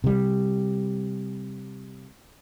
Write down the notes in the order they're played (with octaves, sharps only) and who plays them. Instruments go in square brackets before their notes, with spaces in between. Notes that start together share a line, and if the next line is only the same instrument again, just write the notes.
[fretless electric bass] C3 G3